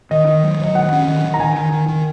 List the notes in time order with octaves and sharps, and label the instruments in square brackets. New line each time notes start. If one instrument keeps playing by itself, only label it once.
[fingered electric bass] D#3 [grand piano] D#5
[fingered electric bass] D#3
F#3
[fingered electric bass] F#3 [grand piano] D#5
[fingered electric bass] D#3 [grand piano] F#5
[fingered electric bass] C#4
D#3
D#3
[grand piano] A#5
[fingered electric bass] D#3 [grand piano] G#5
[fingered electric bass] D#3
D#3
D#3